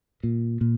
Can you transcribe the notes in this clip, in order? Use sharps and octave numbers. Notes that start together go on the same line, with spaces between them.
A#2
A#2